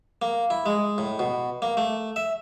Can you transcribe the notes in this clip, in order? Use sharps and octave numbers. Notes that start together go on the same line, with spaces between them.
A#3
E4
G#3
A2
B2
A#3
A3
E5